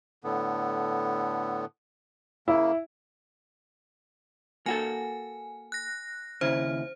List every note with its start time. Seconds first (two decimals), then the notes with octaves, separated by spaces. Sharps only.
0.24 A2 D3 B3
2.48 C#3 A#3 E4
4.66 A#3 F#4 A4 G#5
5.72 F#6 A#6
6.41 D#2 C#3 E4 C5